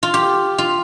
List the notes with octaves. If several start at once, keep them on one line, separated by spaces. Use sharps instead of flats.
F4
G4
F4